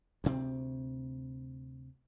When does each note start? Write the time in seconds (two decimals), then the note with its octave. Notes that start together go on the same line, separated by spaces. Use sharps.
0.24 D2 C3 C4